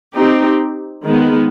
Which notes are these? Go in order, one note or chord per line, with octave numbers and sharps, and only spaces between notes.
C4 D#4 G4
D#3 G#3 B3